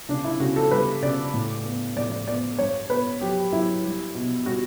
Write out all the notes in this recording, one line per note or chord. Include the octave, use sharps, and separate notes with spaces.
C#3 D4
E4
C#3 F#4
A4
G3 B4
C#3 D5
A2
B3
A2 D5
D5
B3 D5
G2 C#5
B3 B4
F#3 G4
F#3 E4
G3
B2
G3 F#4